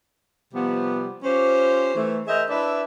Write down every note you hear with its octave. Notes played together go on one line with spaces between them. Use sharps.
C3 F3 G3 B3
C#4 F4 G4 C5
E3 A3
G#4 A#4 C5 D#5 E5
D4 E4 B4 D5 E5